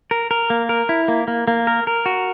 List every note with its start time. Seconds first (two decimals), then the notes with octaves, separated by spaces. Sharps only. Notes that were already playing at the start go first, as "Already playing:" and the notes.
0.11 A#4
0.31 A#4
0.50 A#3
0.69 A#4
0.89 E4
1.08 A#3
1.28 A#3
1.48 A#3
1.67 A#4
1.87 A#4
2.06 F#4